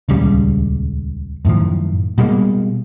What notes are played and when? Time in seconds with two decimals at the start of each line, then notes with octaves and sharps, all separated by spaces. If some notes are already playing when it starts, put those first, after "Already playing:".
0.09 D#1 C#2 C#3 G3
1.45 F#2 A2 D#3 F3
2.18 B2 G3 G#3 A#3